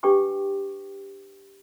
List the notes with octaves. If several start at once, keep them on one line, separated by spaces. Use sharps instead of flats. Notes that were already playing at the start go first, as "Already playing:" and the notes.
D4 G4 B4 G5 C#6 D6